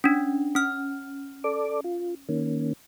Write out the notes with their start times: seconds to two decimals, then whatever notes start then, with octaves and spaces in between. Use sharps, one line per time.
0.04 C#4 D4
0.55 C#4 F6
1.44 A4 D5 D6
1.84 F4
2.29 D#3 A#3 C#4